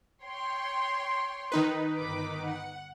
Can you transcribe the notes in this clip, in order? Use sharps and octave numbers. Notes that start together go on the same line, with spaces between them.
C#5 G5 C6
D#3 D#4 B4
G1 B5 D6
F#5